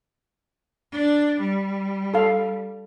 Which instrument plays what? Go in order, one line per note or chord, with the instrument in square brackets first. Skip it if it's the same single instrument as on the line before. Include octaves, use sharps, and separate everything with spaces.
[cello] D4
G3
[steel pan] A4 F5